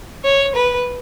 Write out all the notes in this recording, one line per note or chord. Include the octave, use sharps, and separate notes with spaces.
C#5
B4